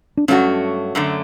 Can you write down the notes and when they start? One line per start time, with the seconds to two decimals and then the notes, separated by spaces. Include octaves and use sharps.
0.17 D4
0.28 G2 F#3 A3 C#4 D4 F#4
0.95 F#2 D3 A3